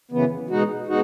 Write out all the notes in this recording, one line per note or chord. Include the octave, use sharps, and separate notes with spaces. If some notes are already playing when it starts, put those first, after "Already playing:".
F#2 C#3 E3 B3
B2 G#3 D#4 F#4
B2 G#3 D#4 F#4